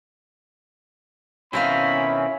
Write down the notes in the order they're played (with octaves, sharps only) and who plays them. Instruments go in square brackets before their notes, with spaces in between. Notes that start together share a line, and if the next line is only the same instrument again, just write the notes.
[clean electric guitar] B2 D#3 C4 [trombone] C#4 [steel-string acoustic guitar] E4 E5 F5 [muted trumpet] B5